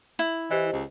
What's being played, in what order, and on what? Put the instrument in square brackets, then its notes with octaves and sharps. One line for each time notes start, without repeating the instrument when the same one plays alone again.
[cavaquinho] E4
[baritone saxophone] E3 [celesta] G4 C5 D#5
[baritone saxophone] C#2